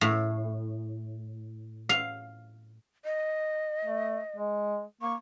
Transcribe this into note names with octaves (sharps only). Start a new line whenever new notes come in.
A2
F5
D#5
A3
G#3
A#3 C#6